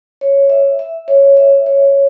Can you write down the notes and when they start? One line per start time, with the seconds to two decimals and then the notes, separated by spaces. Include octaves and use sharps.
0.21 C#5
0.50 E5
0.79 E5
1.08 C#5
1.37 E5
1.66 C#5